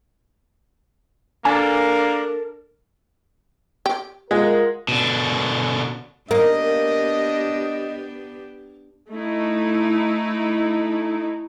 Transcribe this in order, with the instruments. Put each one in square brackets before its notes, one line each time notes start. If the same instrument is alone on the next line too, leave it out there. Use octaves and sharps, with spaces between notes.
[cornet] A#3 [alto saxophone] D4 [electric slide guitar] A4 A#4 [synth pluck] G#5
[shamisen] G4
[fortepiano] G#3 [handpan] F4 F#5 [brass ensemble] A#4
[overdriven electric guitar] B2 D3
[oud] A#3 [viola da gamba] B3 D4 G4 [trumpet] D#5
[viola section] A3 D#4 E4